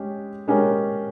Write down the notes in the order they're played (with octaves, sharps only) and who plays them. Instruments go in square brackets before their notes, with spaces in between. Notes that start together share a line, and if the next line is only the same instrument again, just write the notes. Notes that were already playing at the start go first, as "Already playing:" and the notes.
Already playing: [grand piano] G#3 C#4 G4
G#3 C#4 G4 A#4